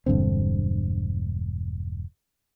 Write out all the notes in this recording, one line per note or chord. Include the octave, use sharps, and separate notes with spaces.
E1 G2 D3 C4